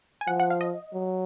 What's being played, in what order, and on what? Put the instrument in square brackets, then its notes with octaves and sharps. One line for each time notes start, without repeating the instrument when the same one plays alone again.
[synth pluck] G#5
[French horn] F3 [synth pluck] F#5
[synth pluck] F#5
F5
D#5
[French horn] F#3